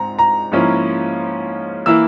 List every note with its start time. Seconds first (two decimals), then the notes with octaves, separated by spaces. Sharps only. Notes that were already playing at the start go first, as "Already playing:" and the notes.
Already playing: G#2 C4 A#5
0.19 A#5
0.52 G#2 F3 A#3 C#4 E4
1.86 E3 A#3 E4 E6